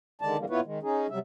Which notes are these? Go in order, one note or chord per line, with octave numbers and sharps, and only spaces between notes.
D3 D#3 G#3 D5 A5
D3 E3 G3 G#3 A#3
A#2 B3 E4 F4 B4 C#5
D#3 G#3
C#4 D#4 G#4
C3 F#3 G3 E5